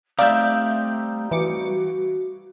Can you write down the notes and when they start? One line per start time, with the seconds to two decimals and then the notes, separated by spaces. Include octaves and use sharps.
0.19 G3 A3 C4 D#4 D5 E5 F5 G6
1.31 E3 F#4 D6 C#7